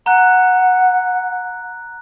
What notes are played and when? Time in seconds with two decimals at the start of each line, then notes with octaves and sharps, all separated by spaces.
0.06 F#5 A#5 F#6